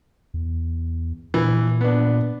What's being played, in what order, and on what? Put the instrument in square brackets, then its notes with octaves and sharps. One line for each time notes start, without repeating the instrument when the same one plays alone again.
[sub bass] E2
[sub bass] A#2 [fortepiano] E3
[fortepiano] B3 D4